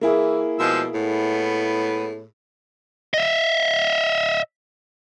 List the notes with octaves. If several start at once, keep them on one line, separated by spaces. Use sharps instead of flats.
E3 A#3 E4 G#4
B2 F3 G#3 E6
A2 B3
D#5 E5